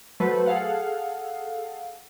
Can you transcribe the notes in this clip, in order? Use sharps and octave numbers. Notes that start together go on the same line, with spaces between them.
F#3 A3 A4 B4 C5
G#4 A4 F5 F#5